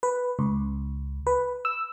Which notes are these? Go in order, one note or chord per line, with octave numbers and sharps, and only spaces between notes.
B4
C#2
B4
E6